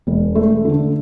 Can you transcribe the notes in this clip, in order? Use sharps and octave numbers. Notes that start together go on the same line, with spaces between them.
E1
A3
D3